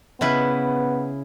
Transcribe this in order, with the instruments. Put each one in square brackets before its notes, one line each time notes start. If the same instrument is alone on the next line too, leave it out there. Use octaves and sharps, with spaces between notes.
[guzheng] C#3 E4 B4 [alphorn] B3